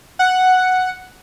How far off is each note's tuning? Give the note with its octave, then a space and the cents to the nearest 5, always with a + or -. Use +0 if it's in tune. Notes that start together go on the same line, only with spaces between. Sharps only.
F#5 +0